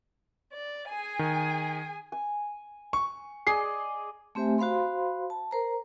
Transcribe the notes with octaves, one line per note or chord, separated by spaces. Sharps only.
D5
G#4 G#5
D#3
G#5
C#6
G#4 D5 D#5 C7
A3 C4 G4 C5 E5 G#5
F#4 C5 F5 B5 C6
A5
A#4 C5 A#5